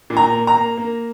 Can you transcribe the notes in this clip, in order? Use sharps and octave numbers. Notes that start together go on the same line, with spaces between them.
A#2
A#5
A#3
A#5
A#3
A#3